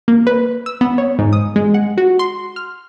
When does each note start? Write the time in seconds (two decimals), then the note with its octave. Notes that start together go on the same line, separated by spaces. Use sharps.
0.08 A#3
0.27 B4
0.66 E6
0.81 B3
0.98 C#5
1.19 G#2
1.33 D#6
1.56 G#3
1.74 F#5
1.98 F#4
2.19 C6
2.56 F6